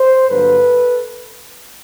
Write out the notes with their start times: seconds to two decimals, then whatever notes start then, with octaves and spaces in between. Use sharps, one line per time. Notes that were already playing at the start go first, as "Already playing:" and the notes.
Already playing: C5
0.29 G2 D3 F#3 A#3 A4 B4